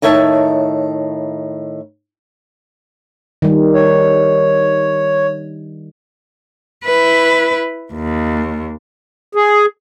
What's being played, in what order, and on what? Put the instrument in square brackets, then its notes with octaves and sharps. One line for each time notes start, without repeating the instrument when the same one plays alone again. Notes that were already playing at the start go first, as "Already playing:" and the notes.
[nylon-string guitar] A2 D#3 C#5 E5 G5 A5
[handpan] D#3 G3
[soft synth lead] C#5
[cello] E4 B4
D#2
[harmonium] G#4